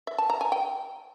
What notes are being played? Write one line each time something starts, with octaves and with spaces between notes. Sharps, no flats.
E5
A5
A#5
G#5
G5